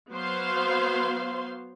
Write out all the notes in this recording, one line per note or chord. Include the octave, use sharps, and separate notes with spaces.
F#3 B3 C5 F5 C6